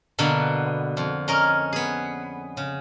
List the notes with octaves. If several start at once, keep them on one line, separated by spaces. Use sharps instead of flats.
B2 D3 A#3 B3
F2
C#4 A#4 D#5
B3 G#4
C#3